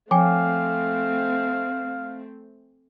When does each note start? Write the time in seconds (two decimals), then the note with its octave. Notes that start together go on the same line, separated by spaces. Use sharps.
0.11 F3 A3 C4 F5 G5 G#5 D6